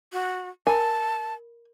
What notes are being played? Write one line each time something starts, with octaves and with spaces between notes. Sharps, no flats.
F#4
A#4 G#5 A5 B5